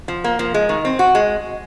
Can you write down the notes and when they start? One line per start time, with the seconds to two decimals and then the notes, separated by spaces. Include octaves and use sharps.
0.08 F3
0.24 A#3
0.39 F3
0.54 G#3
0.69 D#3
0.85 C4
0.99 F#4
1.15 G#3